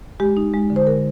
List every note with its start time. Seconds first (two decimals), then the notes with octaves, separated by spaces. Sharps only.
0.20 G#3 G4
0.37 D#4
0.53 G#3
0.70 D3
0.76 C5
0.87 A#4